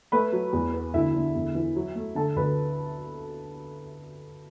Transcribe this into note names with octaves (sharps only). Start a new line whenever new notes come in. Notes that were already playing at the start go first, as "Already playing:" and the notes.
A3 B4 B5
F#3
E2
B3
D2 E4 E5
D3
E2
E3
F#3
A3
D3 A4 A5
D2 B4 B5